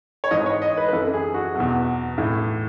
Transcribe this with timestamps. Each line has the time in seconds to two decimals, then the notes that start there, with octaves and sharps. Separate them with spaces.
0.24 C#5
0.31 G#2 E3 D#5
0.46 C#5
0.62 D#5
0.77 B4
0.88 B4
0.93 F#2 E3 A4
1.14 G#4
1.34 F#4
1.55 E2 B2 F#3
2.18 A2 E3